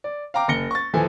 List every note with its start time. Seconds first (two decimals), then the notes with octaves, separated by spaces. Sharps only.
0.04 D5
0.34 F5 G5 A#5 D6
0.48 F#1 A#6 C#7 G7
0.71 C#6 A6
0.93 D#1 E3 F3 A4 G#5